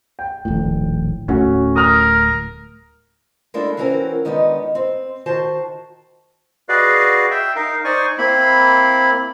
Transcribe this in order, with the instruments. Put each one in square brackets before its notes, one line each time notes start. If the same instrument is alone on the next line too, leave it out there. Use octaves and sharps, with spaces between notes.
[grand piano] G5
[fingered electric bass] D#1 A#1 A2
[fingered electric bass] D1 A2 A3 [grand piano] C#4 F#4
[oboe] A#4 [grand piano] D#6 F6
[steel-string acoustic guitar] G#3 A#3 D4 E4 F#4 A4
E3 A#3 C4 C#4 F#4 A#4
D#3 G#3 B3 D4 D#4
C4
D#3 F#4 C5 A5
[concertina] F#4 G#4 B4 D5 D#5 F5
E5 G5
D#4 A#4 F5
D#4 C5 D5 G#5 C#6
A#3 C4 E4 B5